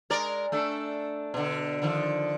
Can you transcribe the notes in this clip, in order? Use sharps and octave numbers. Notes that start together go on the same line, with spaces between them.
G#3 A#4 D5
A3 D4 A4
B2 D3
D3 D#3 F3